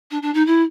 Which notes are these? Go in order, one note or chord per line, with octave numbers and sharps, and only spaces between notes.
D4
D4
D#4
E4